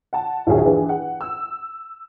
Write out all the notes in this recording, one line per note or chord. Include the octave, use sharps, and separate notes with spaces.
F#5 A5
A#1 D#2 D#3 F#3 G#4
E3 D4 G#4 B4
F#5
E6